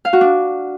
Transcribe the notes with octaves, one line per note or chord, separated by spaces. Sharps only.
F5
F#4
D4